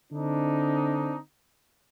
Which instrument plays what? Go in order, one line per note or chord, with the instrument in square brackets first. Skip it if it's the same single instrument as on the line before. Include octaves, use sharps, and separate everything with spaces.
[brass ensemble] D3 C4 D4 D#4